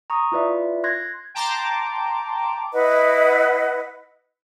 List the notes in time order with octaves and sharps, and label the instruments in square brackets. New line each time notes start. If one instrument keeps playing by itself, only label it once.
[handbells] A#5 C#6 D#6
E4 F4 B4 D5 E5
C6 F#6 G#6 A#6
[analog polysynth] G5 A5 A#5 C6 D6
[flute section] E4 B4 D#5 F#5